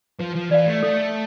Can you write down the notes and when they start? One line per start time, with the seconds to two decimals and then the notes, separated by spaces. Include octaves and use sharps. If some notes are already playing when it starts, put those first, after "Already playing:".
0.19 F3 B4
0.35 F3
0.51 E3 D5 F5
0.67 A3
0.83 A3 A4